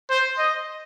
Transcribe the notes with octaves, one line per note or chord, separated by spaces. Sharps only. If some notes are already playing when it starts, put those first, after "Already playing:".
C5
D#5